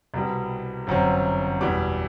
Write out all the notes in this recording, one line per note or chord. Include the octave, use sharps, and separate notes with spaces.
C2 B2 G3
G1 F#2 F#3 C4
E2 B2 G3 D6